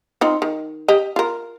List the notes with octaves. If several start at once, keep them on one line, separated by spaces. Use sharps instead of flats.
C4 D#4 F4
D#3
G4 D#5
F4 A#4